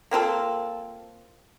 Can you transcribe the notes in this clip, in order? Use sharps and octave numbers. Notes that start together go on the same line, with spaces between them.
A#3 C4 F4 A4